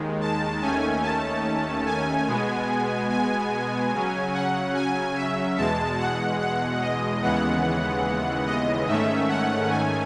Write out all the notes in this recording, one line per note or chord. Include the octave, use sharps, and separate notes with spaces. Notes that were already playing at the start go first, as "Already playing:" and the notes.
Already playing: D#2 D#3 G#3
A5
D#2 D#3 A3 C#4 G#5
A5
G#5
B2 G#3 B3
G#5
C#3 F#3 C#4
F#5
G#5
E5
E2 B2 G#3 A5
F#5
F#5
D#5
D#2 C#3 E3 G#3 B3 F#5
D#5
G#2 D#3 A3 C#4 E5
F#5
G#5